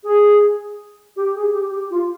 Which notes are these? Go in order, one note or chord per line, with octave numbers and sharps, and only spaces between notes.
G#4
G4
G#4
G4
G4
F4